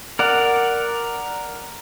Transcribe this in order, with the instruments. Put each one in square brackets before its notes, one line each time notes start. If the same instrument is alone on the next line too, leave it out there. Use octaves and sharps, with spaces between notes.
[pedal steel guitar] A#4 D5 F#5